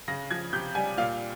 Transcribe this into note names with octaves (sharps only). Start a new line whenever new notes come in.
C#3 A#6
F3 G#6
C3 G6
G3 G#5
A#2 F5